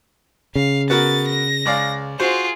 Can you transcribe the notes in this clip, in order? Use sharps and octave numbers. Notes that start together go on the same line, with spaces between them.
C#3 F5
B3 F#4 A#4 A6
A#6
C#2 D5 F5
F4 F#4 G#4 C5